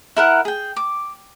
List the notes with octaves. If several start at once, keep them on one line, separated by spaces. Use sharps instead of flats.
E4 A#4 F#5
G#4 G5
D6